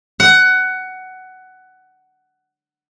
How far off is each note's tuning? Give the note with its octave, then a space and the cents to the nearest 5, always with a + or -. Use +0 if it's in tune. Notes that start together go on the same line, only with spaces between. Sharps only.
F#5 +15